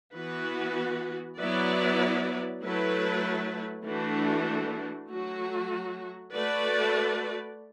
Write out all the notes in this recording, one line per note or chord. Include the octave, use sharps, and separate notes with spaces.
E3 B3 F#4 B4
F#3 B3 E4 B4 D5
F#3 A3 E4 B4
E3 A3 D4 F#4
F#3 A3 F#4
A3 F#4 B4 D5